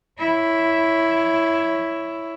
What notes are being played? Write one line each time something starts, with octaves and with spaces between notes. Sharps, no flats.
E4 C#5